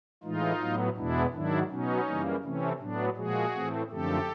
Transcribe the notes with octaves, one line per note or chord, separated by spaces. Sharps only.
A2 E3 G#3 D#4 F4
A2 F#3 B3
E2 B2 G#3 B3 D4 E4
G#2 D#3 F#3 D4 E4
B2 F#3 B3 C#4 D#4
F#2 C#3 E3 G3 A#3
C3 E3 A3 C4 C#4
A2 F#3 B3 D4
A#2 F3 G#3 F#4 G#4
A2 E3 A3 C4
F#2 D3 F3 A3 C4 G4 A4